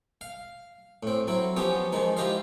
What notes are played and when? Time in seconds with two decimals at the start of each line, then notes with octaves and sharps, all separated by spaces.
0.21 F5
1.03 A2 C4
1.28 F#3 C4 E4
1.56 F3 B3 C#4 F4 G4 D#6
1.92 D#3 F3 G#3 D#4
2.17 E4 F4 G4 C5 D#5 F5